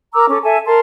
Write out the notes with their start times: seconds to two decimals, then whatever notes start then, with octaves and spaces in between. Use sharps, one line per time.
0.14 A#4 A#5 D6 E6
0.30 C#4 A4 D6
0.44 A4 E5 G#5 A5
0.66 A#4 A5 C6